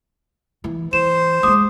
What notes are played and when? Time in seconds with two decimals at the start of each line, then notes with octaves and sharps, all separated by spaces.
0.64 E3
0.93 E3 C5 E7
1.43 G3 G#3 D6 D#6